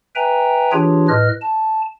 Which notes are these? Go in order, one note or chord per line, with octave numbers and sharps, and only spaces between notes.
B4 E5 G5 G#5 A#5
E3 D4 F4 G4 G#4 C#5
A2 B4 D#5 F6
A5